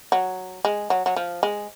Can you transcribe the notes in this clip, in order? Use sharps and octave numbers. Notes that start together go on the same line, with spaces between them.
F#3
G#3
F#3
F#3
F3
G#3